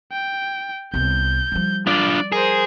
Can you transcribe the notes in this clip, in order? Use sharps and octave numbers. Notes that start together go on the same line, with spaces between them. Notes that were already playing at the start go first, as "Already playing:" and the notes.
G5
C2 B3 G6
F3 G3
D4 F4 D5
G#4 A#4 C5